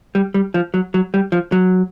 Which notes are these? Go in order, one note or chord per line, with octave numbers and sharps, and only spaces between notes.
G3
G3
F3
F#3
F#3
G3
F3
F#3